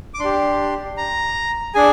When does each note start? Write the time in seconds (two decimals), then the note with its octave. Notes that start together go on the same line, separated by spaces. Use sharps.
0.14 D6
0.20 D4 G4 C6
0.97 A#5
1.74 D4 G#4 G#5